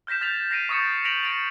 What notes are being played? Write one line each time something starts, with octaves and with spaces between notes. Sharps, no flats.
F6 G6 A#6 B6 E7
F6 G6 A6 B6 F7
A#6 C7 D7 D#7
C#6 D#6 A6 C#7 E7
A#6 B6 D7 F7 F#7
A6 D7 F7